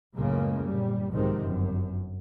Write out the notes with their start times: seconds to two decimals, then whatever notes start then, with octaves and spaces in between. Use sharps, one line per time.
0.16 C#2 F#2 A2 C#3 G#3 A#3
0.67 G1 A#2 G3
1.13 B1 G#2 C3 D#3 F3 C4
1.42 G1 F#2